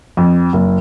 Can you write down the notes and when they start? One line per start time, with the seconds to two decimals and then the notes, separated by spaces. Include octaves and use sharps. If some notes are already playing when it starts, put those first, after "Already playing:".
0.17 F2
0.53 F#1